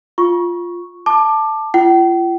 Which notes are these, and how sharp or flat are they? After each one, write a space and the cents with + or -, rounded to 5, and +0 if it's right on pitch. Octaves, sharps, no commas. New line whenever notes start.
F4 +0 C#6 +0
A5 +0 D6 +20
F4 -35 G5 -40